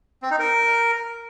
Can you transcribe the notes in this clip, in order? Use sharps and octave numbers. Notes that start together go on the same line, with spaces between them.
C4
D#4
A#4